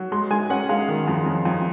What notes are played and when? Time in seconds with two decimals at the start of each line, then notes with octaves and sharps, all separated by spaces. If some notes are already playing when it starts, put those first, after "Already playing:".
Already playing: F#3
0.12 G#3 C6
0.31 G#3 G#5
0.50 C#4 F#5
0.69 G#3 F5
0.88 D#3
1.08 F2
1.26 F2
1.45 F2